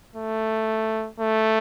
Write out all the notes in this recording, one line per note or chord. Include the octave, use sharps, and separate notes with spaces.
A3
A3